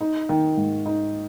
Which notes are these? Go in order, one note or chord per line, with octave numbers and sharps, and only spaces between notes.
D#4
D#3
G#2
D#4